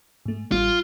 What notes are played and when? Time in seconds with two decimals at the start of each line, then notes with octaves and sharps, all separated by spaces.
0.26 G#2 A3
0.52 A1 G3 F4